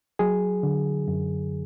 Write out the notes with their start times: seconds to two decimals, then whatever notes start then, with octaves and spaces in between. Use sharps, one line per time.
0.19 F#3 G#4
0.63 D3
1.08 F#2